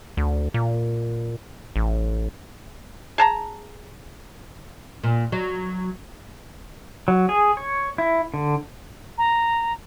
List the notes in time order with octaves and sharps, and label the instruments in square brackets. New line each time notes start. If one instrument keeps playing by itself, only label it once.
[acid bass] D2
A#2
A1
[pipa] G#4 A5 A#5
[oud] A#2
F#3
[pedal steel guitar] F#3
G#4
C#5
E4
D3
[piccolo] A#5